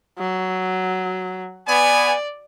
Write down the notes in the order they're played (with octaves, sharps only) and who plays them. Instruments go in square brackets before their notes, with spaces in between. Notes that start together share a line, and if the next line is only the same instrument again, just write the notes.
[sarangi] F#3
[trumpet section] B3 G#5 [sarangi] D5